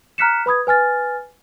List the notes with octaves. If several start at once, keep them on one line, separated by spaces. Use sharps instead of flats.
A#5 F6 F#6 B6 C#7 E7
B4 B5 D#6 G#6
B4 G#5 F6 A6